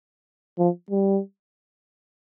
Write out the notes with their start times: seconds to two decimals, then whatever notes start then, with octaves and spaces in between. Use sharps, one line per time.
0.59 F3
0.91 G3